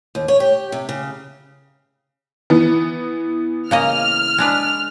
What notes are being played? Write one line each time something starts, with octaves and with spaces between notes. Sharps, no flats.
D#2
C#5
G4
C3
C#3
E3 B3
C#3 A#3 D#5 F6
G#3 D4 B4